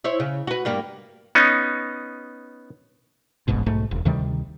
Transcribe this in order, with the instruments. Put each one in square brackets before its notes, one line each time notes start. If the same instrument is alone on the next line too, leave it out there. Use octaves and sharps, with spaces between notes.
[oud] E4 C5 C#5
C#3
F#4 B4
G2 G3 A#3
[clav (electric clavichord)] B3 C#4 D#4
[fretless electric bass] E1 A1 G#2 B2
B1 G#2 A3
E1
D2 C3 D#3 G3